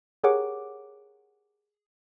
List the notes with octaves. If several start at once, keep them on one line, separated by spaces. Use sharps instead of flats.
G4 G#4 A#4 C#5 F#5 D6